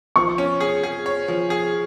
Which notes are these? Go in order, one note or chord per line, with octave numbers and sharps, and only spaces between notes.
F3 C#6
C#4
G#4
G#4
C#5
F3
G#4